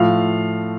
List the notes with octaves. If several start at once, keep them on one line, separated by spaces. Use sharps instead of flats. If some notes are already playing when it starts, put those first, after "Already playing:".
Already playing: A2 F3 F5